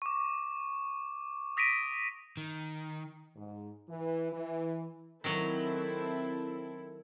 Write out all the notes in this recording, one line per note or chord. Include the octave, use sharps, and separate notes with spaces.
C#6 D6
D#6 A#6 B6 D7 D#7
D#3
G#2
E3
E3
D#3 F#3 C4 E4 A4